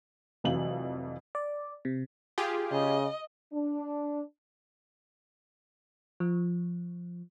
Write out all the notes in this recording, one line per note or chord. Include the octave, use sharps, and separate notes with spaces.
F1 F2 E3 F#3 F5 F#7
D5
C3
F4 G4 G#4
C#3 D#5
D4
F3